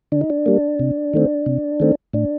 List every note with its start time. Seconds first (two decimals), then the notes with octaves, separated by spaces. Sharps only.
0.12 D3 D4
0.21 D#4
0.30 D4
0.46 G3 A#3
0.79 C3
1.13 D#3 A3 C4
1.46 C3
1.80 D#3 A3 C4
2.13 A2 D4